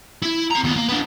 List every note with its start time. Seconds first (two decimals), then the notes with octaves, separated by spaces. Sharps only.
0.23 E4
0.51 C4 A#5
0.64 D#2 B3
0.77 A#3
0.89 B3 D4